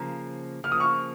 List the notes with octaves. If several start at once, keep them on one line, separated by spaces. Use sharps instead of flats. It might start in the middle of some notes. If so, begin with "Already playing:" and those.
Already playing: C#3 F3 A#3 A#5
C#3 F3 A#3 F6
D#6
C#6 F6